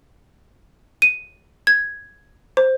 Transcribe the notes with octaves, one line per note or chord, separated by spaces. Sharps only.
D#7
G#6
C5